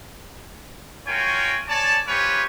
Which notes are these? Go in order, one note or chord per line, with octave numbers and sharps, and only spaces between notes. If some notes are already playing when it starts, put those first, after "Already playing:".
F4 F#4 A#4 C#5 G5 G#5
C#5 D5 G#5 A5
C4 F4 G4 B4 C#5 G#5